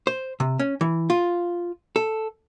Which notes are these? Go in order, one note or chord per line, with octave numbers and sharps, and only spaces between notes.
C5
C3
C#4
E3
F4
A4